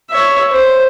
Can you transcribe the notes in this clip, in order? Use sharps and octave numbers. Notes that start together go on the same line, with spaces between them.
C#5 E5
C5